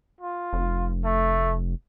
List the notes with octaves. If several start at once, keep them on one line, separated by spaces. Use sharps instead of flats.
F4
F1
A3